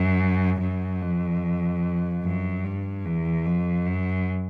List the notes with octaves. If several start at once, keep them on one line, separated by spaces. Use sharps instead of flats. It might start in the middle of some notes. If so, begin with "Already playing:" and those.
Already playing: F#2
F#2
F2
F#2
G2
E2
F2
F#2